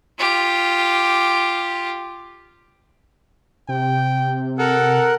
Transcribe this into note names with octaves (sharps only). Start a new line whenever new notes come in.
F4 G4
C3 G5
A4 A#4 F#5